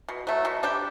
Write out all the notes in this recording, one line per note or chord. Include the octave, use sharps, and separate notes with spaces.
B2
F#3 A3
B2
G3 D4 G4